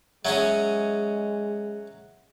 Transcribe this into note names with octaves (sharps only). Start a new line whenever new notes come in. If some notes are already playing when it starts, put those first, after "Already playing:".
F#3 G#3 C#4 G#4 E5